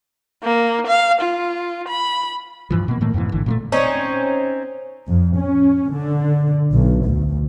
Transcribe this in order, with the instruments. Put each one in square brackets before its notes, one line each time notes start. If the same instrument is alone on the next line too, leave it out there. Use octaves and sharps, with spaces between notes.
[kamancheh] A#3
F5
F4
B5
[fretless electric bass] G2 E3 F3
B2 A#3
A2 D#3 A3 A#3
F2 G#2 B2 E3
G#1 D3 E3
A#2 G#3 A3
[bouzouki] C4 C#4 D#4
[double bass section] F2
C#4
D3
B1
D2